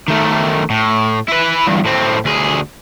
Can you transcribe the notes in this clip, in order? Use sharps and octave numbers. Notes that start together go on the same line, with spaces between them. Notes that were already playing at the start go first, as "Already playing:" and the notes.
D#3 A3
A2
E4 B4
E2 G2
A2 C4
D2 G#4